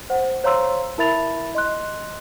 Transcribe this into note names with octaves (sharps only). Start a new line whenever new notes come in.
C5 F#5
C5 C#5 F5 A#5 C6 E6
E4 A#4 E5 B5 A6 F7
D#5 C6 F#6